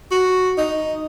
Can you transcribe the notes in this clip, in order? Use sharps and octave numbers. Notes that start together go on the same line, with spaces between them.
F#4
D#4